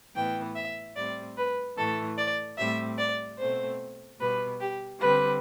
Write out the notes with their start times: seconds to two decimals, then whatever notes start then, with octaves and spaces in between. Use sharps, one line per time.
0.15 A2 E3 B3 G5
0.55 E5
0.96 A2 G3 C4 D5
1.37 B4
1.77 A2 E3 A3 A4
2.17 D5
2.58 A2 G3 C4 E5
2.98 D5
3.38 B2 A3 C4 C5
4.20 B2 G3 B3 B4
4.60 G4
5.01 D3 G3 C4 B4